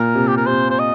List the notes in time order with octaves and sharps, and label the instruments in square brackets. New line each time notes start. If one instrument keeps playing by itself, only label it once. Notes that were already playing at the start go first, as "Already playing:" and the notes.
Already playing: [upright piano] A#2 [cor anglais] A#4
[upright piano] C3
[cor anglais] G4
A#4
[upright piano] C3 [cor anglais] C5
[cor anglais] C5
D#5